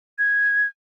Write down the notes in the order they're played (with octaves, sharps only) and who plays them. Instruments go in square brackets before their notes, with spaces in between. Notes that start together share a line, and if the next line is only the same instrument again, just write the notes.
[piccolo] G#6